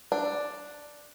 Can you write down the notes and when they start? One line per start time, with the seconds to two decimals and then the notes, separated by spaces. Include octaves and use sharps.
0.12 D4